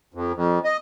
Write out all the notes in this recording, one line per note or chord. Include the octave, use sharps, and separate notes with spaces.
F2
F2
D#5